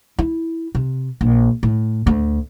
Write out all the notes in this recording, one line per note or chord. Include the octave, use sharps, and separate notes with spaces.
E4
C3
A#1
A2
D2